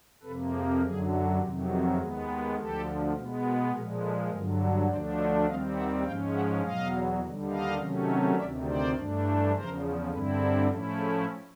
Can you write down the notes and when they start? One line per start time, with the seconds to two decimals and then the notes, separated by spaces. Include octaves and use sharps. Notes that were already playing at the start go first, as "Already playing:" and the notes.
0.23 F2 C3 F3 A#3 A4 B4
0.52 G#4
0.81 F#2 D3 F#3 G#4
1.39 F2 C3 D#3 F#3 G4
1.69 G#4
1.98 D#2 D#3 G#3 B3 G#4
2.26 G#4
2.55 D2 D3 F3 G4 A4
3.14 B2 G#3 B3
3.42 G#4 A#4
3.71 A#2 F3 G#3 G#4 A#4
4.01 A4 B4
4.30 G2 D3 F#3 G#4 A#4
4.58 G4 A4
4.88 D2 D3 F3 A3 D4 C5 D5
5.16 C#5 D#5
5.46 D#2 D#3 G3 C4 D#5 F5
5.75 E5 F#5
6.03 G#2 F3 G#3 C#4 F5 G5
6.32 E5 F#5
6.61 E2 B2 F#3 D#5 F5
7.20 D#2 D3 G3
7.48 D#5 F5
7.77 C3 D#3 F#3 A3 C#4
8.35 D2 C3 D#3 D5 E5
8.65 C5 D5
8.94 G2 E3 A3 D4
9.52 E2 C#3 F3 A#4 C5
10.09 G2 D3 G3 C4 E4 A4 B4
10.38 G#4 A#4
10.67 A2 F3 A3 C#4 E4 G4 A4
10.97 G#4